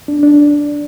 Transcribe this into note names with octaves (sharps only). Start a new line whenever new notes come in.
D4
D4